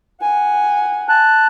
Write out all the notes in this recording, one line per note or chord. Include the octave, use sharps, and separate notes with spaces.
F#5 G#5
A5 F#6